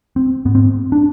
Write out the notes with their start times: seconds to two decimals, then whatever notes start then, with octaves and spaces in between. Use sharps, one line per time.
0.16 C4
0.45 G#2 B3
0.55 C4
0.92 D4